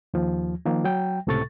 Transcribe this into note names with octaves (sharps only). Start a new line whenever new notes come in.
D#2 F3
D#3 F3 A#3
F#3 G5
C#2 A2 C3 A4 C#6 A6